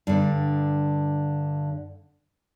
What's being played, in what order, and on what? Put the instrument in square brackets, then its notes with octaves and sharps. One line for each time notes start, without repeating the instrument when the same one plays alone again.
[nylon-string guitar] G2 D3